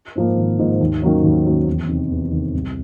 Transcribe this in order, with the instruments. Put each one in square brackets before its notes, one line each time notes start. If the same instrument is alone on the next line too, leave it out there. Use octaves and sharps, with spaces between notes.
[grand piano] G#2 F3 A#3
G#1
G#2 F3 A#3
D#2
D#3 F#3 A#3 C#4
D#2
D#3 F#3 A#3 C#4
E2
C3 D#3
E2
C3 D#3
C2